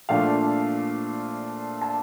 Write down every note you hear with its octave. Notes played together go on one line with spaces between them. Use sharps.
A#2 F3 A3 D4 F5
A5